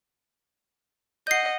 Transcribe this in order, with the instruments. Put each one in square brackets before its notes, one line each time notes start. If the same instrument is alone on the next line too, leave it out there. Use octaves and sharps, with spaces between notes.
[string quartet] D#5 F#5 [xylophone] G6 C7